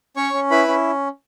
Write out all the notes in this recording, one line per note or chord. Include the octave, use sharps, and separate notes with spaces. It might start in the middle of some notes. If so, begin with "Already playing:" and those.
C#4 C#5 C#6
C#4
E4 B4 B5
C#4